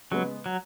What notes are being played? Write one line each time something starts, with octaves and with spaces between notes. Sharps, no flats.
C#3 F#3 G#3 B3
F#3